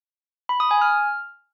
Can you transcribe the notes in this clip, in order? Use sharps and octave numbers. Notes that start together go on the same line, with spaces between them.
B5
D#6
G#5
F6